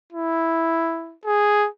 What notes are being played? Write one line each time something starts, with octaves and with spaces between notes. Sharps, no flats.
E4
G#4